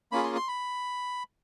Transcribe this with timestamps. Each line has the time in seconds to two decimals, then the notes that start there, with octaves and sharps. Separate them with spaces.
0.12 A#3 C#4 F4 G#4 B5
0.23 C6
0.36 C6
0.48 B5